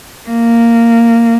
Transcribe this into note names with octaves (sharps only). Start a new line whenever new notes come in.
A#3